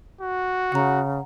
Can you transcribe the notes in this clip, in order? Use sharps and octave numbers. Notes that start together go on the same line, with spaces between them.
F#4
C#3 F#5 A#5